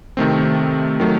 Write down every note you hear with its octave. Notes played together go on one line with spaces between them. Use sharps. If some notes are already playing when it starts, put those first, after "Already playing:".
C3 D#3 A3 C4
D#3 F#3 A3